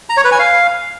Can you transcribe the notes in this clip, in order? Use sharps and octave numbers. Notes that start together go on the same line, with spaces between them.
A#5
C#5
B4
G#5
F5